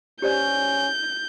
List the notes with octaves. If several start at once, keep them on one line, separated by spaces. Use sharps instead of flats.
C#4 G4 C5 D5 G6